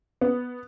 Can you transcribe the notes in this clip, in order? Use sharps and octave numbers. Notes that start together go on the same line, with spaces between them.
B3